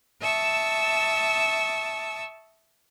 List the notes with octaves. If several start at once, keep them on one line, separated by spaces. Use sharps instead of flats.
E5 A5 C#6 D#6 E6